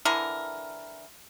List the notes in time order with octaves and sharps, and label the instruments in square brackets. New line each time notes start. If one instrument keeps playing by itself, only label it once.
[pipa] D3 E3 A#4